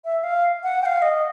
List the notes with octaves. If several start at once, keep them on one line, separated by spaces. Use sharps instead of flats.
E5
F5
F#5
G5
F5
D#5